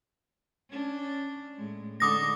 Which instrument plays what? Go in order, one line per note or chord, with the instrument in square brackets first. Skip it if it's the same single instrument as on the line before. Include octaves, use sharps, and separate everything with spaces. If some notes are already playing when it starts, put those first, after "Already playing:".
[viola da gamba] C#4 D4
A2 G#3
[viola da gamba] D3 G#3 D#4 [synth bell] D6 D#6 A#6